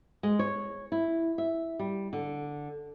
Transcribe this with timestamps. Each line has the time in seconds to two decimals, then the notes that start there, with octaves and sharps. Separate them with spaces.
0.23 G#3
0.39 C#5
0.92 E4
1.38 E5
1.79 G3
2.13 D3